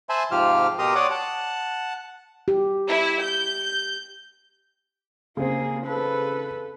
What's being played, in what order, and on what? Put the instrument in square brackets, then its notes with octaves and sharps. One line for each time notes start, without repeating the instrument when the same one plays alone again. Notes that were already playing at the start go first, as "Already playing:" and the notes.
[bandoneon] C5 E5 G#5 A5 B5 C6
G#2 C3 F3 F4 G4 F6
B2 G4 A#4 A#5 C6 D#6
C#5 D5 F#5 C6 D6 D#6
F#5 A5
[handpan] G4
[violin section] E4
G6
[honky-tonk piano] C#3 C4 [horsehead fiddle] A#3 G#4
[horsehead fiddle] A4 B4